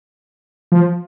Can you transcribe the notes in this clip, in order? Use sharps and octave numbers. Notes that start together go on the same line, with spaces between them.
F3